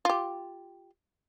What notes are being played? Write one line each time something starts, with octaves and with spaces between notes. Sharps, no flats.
F4 G4